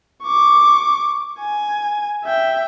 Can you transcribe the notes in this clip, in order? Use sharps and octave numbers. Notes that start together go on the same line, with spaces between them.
C#6 D6
G#5
E5 G5